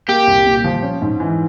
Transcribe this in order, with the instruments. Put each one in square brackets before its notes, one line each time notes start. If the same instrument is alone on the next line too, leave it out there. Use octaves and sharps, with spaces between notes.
[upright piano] A#3 [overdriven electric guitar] G4
[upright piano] C2
A#2
F3
C#4
G#2
E3